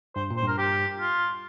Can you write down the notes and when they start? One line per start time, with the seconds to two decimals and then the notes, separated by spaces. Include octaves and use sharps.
0.16 G2 C5
0.31 A#2
0.37 C5
0.43 G2 A#4
0.58 G4
0.99 F4